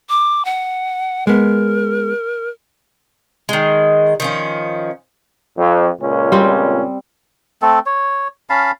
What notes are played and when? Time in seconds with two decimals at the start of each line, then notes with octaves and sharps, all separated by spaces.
0.09 D6
0.45 F#5
1.27 G#3 B3 A#4
3.49 D#3 G#3
4.20 D#3 F3 C#4
5.57 F2
6.00 C#2 A#2 C#4
6.32 G3 C4
7.62 A3 C4 A4
7.86 C#5
8.50 C#4 F5 A5 B5